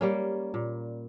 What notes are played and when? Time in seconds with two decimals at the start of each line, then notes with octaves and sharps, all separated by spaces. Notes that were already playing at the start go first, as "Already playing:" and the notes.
0.01 G3 A#3 C#4
0.54 A#2